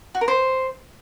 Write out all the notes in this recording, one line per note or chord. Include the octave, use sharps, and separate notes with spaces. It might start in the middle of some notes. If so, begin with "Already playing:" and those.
F#4
A#4
C5